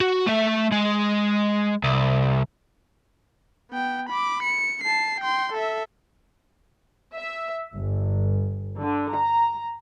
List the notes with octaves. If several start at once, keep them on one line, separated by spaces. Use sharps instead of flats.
F#4
A3 E5
G#3
C2
B3 G5
B5 D6
C#7
A5 C7
G5 C6
A4 E5
E5
G1
D3
A#5